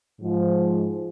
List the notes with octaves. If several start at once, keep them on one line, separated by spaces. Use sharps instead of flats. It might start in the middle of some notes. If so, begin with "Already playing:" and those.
G#2 F3